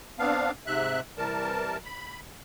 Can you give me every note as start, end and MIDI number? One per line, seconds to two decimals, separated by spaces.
0.19 0.51 59
0.19 0.51 60
0.19 0.51 62
0.19 0.51 77
0.67 1.00 44
0.67 1.00 48
0.67 1.00 76
0.67 1.00 90
1.18 1.77 48
1.18 1.77 52
1.18 1.77 55
1.18 1.77 70
1.18 1.77 81
1.84 2.20 83